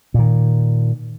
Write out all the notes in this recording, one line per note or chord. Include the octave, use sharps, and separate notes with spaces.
A#2 D#3